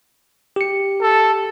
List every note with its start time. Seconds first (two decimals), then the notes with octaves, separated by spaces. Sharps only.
0.56 G4 C#7
1.01 A4